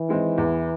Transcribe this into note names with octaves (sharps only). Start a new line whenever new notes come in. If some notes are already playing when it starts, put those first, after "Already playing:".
Already playing: E3
D#3 G#3 C4 D#4
E2